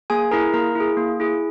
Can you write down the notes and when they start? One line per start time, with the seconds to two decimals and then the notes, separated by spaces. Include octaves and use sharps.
0.10 A#3 G#4 G#5
0.31 E4 G#4 A#4 A#5
0.54 A#3 A#4 A#5
0.75 E4 G#4
0.97 A#3
1.20 E4 G#4